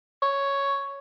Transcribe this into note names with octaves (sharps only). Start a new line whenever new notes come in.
C#5